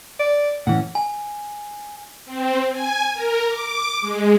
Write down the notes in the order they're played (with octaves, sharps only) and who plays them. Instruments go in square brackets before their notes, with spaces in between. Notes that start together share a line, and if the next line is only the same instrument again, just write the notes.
[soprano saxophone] D5
[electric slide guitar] A2 E3 C#4 [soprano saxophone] F#5
[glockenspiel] G#5
[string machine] C4
G#5
A#4
D6
G#3